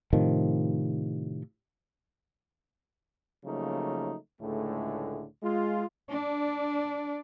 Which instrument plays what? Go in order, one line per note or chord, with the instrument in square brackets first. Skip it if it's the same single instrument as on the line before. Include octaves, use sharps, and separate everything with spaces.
[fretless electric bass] A2 C3 D#3 F3
[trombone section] C#3 F3 F#3 A3 A#3 D#4
C#2 A2 D3 G#3 A3
G#3 F4
[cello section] D4